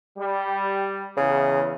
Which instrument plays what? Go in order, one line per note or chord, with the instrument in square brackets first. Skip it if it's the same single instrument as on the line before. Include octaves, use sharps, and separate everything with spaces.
[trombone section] G3
[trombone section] E2 [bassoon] C#3